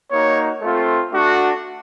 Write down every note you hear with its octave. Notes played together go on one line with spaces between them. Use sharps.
A#3 D#4 F#4 C#5
A3 C4 F4
A3 D4 F#4